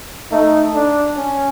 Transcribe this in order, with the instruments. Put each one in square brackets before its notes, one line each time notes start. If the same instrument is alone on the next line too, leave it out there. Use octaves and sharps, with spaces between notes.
[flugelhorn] A3 [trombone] D#4
[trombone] D4
C#4